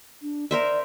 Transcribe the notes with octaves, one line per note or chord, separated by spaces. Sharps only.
D4
A#4 C5 D5 E5